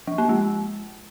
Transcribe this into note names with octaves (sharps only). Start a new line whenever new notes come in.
F3
A#3
G#3